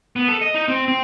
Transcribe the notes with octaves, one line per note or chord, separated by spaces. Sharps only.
B3
A4
D#5
D#4
C4
C4